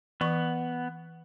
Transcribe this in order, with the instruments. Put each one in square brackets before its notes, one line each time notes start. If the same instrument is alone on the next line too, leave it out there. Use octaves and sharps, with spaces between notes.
[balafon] E3 C#6 [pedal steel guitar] B3